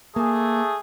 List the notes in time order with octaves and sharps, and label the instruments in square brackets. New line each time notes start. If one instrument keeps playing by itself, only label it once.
[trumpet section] A3 G#4 [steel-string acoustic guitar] A#3